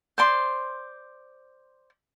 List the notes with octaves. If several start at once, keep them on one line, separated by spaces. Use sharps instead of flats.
C5 D5 C6